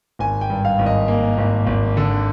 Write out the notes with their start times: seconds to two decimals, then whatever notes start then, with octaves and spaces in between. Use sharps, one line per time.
0.19 G#1 G#5
0.41 G5
0.50 G2
0.65 F5
0.79 G#1
0.86 D#5
1.08 A#3
1.38 G#1
1.67 G#1
1.97 D3